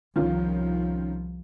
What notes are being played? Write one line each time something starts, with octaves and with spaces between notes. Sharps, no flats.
C2 D#3 F3 C#4 F4